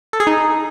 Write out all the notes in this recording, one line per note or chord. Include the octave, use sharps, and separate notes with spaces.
A4
G#4
D#4